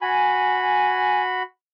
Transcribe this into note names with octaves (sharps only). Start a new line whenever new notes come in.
F#4 G#5 B5